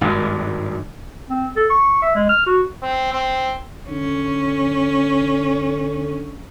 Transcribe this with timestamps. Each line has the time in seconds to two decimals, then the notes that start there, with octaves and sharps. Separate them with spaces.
0.01 G#1 G2
1.30 C4
1.56 A4
1.70 C#6
2.02 E5
2.15 G#3
2.29 F6
2.46 F#4
2.83 C4
3.13 C4
3.90 D3 C#4